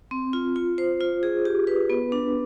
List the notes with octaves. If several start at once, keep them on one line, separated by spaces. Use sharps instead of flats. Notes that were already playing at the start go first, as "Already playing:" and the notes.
C4
F4
F4
C5
F4
G#4
G4
B4
B3
D4